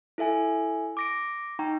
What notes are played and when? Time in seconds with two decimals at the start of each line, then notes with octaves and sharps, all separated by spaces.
0.18 E4 A4 E5 G#5
0.97 D6 A#6 D7
1.59 D#4 G5 A#5 C#6